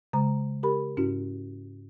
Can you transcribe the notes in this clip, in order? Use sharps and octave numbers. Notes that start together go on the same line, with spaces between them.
C#3 G#3 A#5
G4 A#4 B5
G#2 C#4 E4 F#4